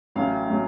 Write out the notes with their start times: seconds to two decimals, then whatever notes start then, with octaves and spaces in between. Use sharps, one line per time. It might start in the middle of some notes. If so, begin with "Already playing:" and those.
0.16 A1 A2 F#3 C#4 F5
0.49 A2 F#3 C#4